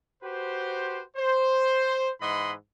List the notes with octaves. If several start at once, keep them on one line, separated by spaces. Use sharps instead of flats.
F#4 G4 B4 C5
C5
G#2 E3 D#5 F#5 B5 C6